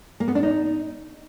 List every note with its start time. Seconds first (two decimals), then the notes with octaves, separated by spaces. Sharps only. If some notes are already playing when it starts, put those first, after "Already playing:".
0.20 A#3
0.28 B3
0.35 D4
0.43 D#4